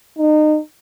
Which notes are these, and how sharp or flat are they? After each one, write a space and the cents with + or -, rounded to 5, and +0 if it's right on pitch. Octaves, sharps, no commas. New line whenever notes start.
D#4 -30